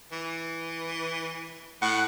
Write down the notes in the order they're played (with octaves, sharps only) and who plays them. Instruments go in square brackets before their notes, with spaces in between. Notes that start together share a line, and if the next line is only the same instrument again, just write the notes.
[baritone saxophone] E3
[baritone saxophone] A2 [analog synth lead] F#5